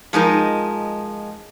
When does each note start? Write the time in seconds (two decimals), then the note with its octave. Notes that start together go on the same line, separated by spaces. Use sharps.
0.13 F3 G#3 D#4 A#4